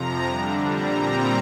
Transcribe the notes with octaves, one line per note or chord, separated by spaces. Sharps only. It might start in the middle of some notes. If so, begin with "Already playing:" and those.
Already playing: F2 C3 F3 A#5
D3 G3 D4
A#2 G3 C4 A#5